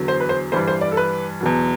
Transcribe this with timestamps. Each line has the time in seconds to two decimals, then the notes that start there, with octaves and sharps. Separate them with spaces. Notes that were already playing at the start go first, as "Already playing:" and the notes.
Already playing: E2 D3 F#3
0.08 C5
0.20 B4
0.29 C5
0.52 G2 E3 G3 C5
0.68 C5
0.81 D5
0.91 A4
0.97 B4
1.41 E2 B2 F#3